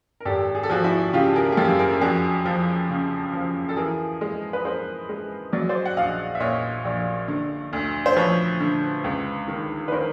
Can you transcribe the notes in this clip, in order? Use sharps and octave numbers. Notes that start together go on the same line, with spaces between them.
A#4
G#1 G4 A4
G#4
A4
F3 F#4 G#4
E4 F#4
C#3 F4 G4
G#4 A#4
G#4
F#2 G4 A4
G#4 A#4
F2 F#4 G#4
F3
C#3
F3
A4
E3 G#4 A#4
G#3
B4
G#3 A#4 C5
G#3
F#3 D5
D#5
C5 D5
F#5
A#1 D#5 F5
E5
A#2 C#5 D#5
A#1
D3
D2
C5
F3 B4 C#5
D3
C#2
D#3
B4
D#3 A#4 C5